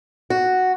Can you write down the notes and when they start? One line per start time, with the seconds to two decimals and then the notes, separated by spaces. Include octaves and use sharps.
0.30 F#4